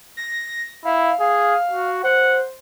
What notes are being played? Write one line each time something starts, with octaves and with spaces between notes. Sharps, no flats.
A#6
E4 F5
G#4 F5
F#4
C5 F#5